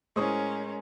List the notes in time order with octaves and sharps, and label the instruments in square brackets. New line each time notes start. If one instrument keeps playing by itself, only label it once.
[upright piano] A2 C5 C#6 [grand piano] G#3 D#6 [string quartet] C#4 A#4